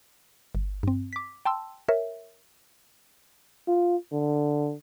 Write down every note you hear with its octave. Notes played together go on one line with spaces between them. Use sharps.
G1
G2 C4
D6 B6
G5 A5 C6 E6
A#4 C#5 E5
F4
D3